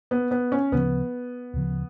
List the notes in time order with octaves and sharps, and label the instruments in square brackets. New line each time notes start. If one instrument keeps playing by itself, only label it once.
[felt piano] B3
B3
C#4
[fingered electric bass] D2 C#3 F3 [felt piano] B3
[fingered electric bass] D2 C#3 F3